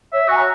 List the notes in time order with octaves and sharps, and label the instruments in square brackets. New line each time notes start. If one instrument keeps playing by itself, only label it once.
[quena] C#5 [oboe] E5
[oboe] F#4 [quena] G#5
[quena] A#5